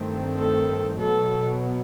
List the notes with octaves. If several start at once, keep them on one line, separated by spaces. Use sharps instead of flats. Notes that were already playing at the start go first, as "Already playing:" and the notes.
Already playing: G2 D#3 A3 C4
A4
B2 F#3 B3 A4